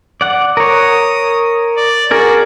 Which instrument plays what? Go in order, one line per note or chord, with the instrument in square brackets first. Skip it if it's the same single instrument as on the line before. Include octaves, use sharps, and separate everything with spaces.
[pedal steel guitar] D5 F#5
[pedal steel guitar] A#4 C#5 [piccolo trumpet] D#6
[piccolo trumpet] D5
[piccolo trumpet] F#4 [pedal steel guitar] G#4 A#4 D5